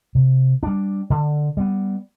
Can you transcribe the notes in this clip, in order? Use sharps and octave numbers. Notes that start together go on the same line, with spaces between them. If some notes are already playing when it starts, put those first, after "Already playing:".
C3
G3 D4
D3
G3 B3